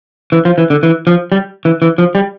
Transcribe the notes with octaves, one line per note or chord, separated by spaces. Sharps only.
E3
F3
E3
D3
E3
F3
G3
E3
E3
F3
G3